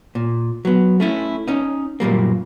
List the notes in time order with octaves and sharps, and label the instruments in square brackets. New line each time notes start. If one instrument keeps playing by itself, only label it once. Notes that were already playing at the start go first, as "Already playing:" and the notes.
[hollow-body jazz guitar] A#2
F#3 B3
A3 C#4 E4
C#4 D#4
F#2 A#2 G3 A#3